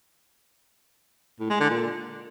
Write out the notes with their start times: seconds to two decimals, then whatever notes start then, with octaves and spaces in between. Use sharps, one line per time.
1.40 A2
1.50 G#3
1.60 D3
1.70 A#2